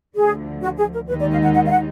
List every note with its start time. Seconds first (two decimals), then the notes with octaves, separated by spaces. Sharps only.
0.16 D2 D3 F3 G#4
0.62 F#4
0.77 G#4
0.93 A#4
1.08 D#2 D#3 G#3 D#4 B4
1.20 D5
1.31 F5
1.43 F#5
1.55 F#5
1.66 F5
1.70 F#5